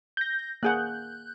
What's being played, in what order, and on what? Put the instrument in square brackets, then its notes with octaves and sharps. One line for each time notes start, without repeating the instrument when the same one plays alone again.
[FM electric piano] G6 A#6
[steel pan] A#3 G#4 F#5 [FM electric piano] F#6 G6